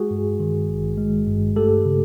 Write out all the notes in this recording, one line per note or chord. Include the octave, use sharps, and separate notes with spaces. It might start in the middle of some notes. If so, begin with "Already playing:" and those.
Already playing: G#3 F#4 G#4
G2
D#3
G#1
G#3
G2
A3 G4 A4
C#3